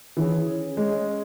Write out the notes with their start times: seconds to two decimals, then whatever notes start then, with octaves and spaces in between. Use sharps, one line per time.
0.17 E3 C#4 G#4 C#5
0.77 G#3 C#4 G#4 C#5